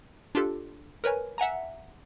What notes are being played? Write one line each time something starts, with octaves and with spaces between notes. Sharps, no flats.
D4 F4 G4 A4
A#4 B4 C#5 G#5
E5 F#5 G#5 A#5